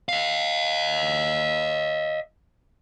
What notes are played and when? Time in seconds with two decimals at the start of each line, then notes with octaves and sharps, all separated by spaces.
0.09 D#5 F5